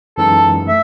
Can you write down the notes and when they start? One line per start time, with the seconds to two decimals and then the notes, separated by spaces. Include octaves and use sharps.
0.18 F#2 E3 G#3 D#4 A4
0.67 A3 E5